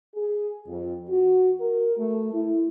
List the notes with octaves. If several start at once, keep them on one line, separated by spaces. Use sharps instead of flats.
G#4
F2
F#4
A#4
A3
E4